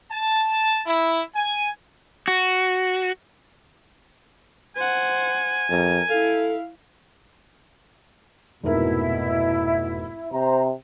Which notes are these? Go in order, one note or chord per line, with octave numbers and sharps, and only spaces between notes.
A5
E4
G#5
F#4
C5 F#5 G#5
F2 A#4
E4 A4 F5
F1 G#2 B2 E4 A#4
C3 C5 A#5